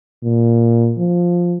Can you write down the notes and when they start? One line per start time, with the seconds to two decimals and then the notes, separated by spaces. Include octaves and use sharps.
0.23 A#2
0.98 F3